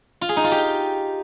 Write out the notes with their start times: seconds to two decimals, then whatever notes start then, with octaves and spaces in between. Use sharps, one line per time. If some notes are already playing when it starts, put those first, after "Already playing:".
0.21 F4
0.29 G#4
0.37 D#4
0.44 F4
0.52 G4